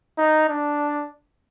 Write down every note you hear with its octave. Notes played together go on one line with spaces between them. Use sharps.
D#4
D4